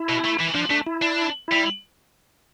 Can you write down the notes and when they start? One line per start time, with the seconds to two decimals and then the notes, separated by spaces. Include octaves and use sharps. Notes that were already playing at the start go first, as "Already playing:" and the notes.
Already playing: E4
0.09 B2
0.24 A3
0.39 E3
0.55 F3 D4
0.70 A3 D4
0.87 E4
1.02 D4
1.48 G3 E4